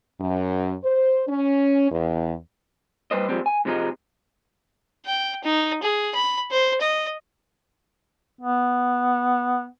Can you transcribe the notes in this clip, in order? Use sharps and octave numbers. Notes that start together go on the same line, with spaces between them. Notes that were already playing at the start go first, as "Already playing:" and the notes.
F#2
C5
C#4
E2
G3 B4 C5 D#5
F3 G3 G#3 C4
G#5
G#2 C3 F3 G#3 D#4
G5
D#4
G#4
B5
C5
D#5
B3